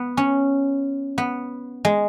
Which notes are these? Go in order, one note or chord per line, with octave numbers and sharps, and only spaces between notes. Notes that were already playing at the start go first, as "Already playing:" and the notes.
Already playing: B3
C#4
B3
G#3